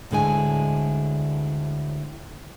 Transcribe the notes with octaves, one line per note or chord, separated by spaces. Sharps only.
D2 A2 D3 G#3 G#5